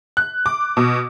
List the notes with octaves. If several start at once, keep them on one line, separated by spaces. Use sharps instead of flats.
F#6
D6
B2